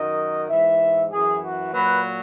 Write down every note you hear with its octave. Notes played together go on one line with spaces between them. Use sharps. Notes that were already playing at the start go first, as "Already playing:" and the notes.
Already playing: F#2 D#3 F#3 D#5
G#2 E3 E5
F#2 E3 G#4
F#4
A#2 F#3 B4